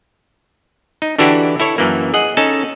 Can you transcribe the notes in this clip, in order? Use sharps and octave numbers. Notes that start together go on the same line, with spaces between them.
D#4
D3 E3 D4 E4 F#4 G4
E4 A4 C#5
F#2 E3 A#3
G#4 D#5 F#5
C#4 D#4 A4 A5